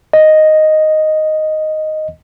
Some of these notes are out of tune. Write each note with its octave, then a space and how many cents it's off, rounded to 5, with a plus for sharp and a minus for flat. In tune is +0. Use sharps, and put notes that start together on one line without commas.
D#5 +0